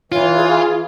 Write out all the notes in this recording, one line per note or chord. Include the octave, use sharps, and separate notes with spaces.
E3 F4 C#5
G#4